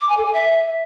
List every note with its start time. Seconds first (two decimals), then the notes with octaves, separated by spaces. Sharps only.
0.01 D6
0.09 G#5
0.17 A4
0.25 G#5
0.34 E5